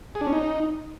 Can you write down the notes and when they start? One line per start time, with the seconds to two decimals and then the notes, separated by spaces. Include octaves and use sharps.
0.15 G#4
0.21 D4
0.27 C#4
0.33 D#4